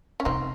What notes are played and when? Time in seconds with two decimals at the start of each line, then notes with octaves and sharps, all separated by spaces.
0.20 C#4
0.25 C3 C4 D#4